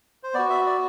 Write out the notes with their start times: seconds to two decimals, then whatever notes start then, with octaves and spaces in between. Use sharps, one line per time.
0.23 C5
0.34 B3 F#4 D5
0.50 E5
0.66 D5